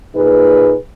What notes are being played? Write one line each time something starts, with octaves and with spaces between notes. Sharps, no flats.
A#2 D#4 G#4 B4